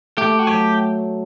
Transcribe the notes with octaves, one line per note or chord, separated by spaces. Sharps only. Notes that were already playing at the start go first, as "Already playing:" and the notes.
A3 G4
F#4
F#3 G4